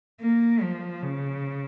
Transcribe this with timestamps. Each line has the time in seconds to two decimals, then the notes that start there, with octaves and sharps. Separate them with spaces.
0.21 A#3
0.62 F3
1.02 C#3